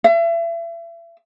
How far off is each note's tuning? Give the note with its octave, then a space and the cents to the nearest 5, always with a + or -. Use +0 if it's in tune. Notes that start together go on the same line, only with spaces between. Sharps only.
E5 +35